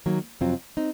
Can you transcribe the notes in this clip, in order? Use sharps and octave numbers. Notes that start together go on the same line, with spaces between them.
D#3 F#3 A#3
F2 C3 F#3 C4 F4
C4 D#4